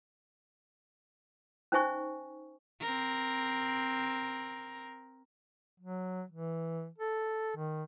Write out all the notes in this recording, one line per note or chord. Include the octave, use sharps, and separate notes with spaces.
C#4 D#4 C5 E5 G#5 C#6
C4 A#4
F#3
E3
A4
D#3